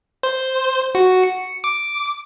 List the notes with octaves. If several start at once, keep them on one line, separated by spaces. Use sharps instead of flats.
C5
F#4
C#7
D6